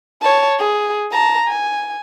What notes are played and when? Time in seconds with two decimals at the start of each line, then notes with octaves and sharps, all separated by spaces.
0.21 C#5 A5
0.59 G#4
1.12 A5 A#5
1.48 G#5